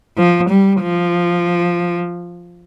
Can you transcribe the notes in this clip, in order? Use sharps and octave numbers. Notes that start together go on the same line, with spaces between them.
F3
G3
F3